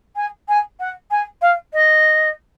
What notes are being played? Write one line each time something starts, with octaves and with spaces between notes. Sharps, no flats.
G#5
G#5
F#5
G#5
F5
D#5